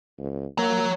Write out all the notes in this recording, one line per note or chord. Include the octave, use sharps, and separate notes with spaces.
C#2
A#3 C#5 A#5